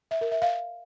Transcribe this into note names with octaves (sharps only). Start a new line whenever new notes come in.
E5
A#4
E5
F5